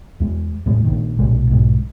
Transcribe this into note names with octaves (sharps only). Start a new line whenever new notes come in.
E2 G#3
E2 A2 G#3
A#1 A#2 D#3
B1 A#2 G#3
B1 G#2